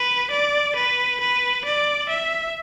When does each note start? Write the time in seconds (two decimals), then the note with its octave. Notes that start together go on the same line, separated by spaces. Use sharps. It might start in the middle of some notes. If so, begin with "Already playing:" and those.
Already playing: B4
0.31 D5
0.76 B4
1.21 B4
1.65 D5
2.09 E5